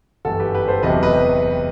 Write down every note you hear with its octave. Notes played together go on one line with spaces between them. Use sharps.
G1 F#2 E3 F#4 A4
G4 B4
G4 B4
A4 C5
E1 E2 C3 F#3 B4 D#5
B4 D#5